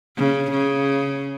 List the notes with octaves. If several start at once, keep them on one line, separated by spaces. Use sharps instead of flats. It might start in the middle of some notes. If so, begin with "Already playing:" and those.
C#3
C#3